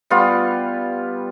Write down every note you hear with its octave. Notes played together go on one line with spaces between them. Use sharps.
G3 B3 F4